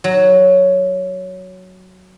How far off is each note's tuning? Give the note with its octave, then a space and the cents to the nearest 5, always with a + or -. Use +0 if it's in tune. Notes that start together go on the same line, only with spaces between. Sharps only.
F#3 +5